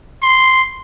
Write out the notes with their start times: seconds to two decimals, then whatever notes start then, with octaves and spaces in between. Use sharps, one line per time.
0.22 C6